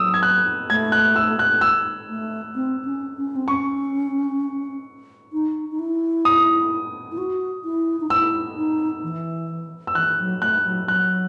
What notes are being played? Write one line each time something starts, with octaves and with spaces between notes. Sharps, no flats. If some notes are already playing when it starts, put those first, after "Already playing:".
Already playing: F#3 D#6 E6
G#6
F#6
A3 G#6
F#6
E6
F#6
E6
A3
C4
C#4
C#4
C4
C#4 C#6
D#4
D#4
E4
D#6
E4
F#4
E4
D#4
E4 E6
D#4
E3
E6
E3 F#6
F#3
A3 F#6
F#3
F#3 F#6